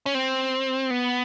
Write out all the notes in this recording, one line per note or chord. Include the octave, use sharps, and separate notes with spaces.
C#4
C4
B3